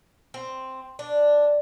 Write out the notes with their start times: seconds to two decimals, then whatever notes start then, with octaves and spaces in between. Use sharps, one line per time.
0.34 C4
0.99 D4